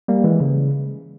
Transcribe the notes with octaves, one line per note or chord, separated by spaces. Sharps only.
G3 A#3
E3 G#3
C#3